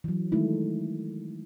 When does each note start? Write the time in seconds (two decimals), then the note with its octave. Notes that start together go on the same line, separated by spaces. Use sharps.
0.04 E3 F#3
0.32 D#3 G#3 A3 D#4 E4